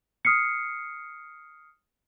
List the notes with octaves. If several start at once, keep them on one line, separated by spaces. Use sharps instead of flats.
D#6 F6 C7 C#7